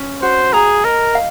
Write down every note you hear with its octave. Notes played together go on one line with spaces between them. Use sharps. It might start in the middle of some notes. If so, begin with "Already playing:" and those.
Already playing: C#4
F#4 C5
G#4 A#5
A#4 D#5
F5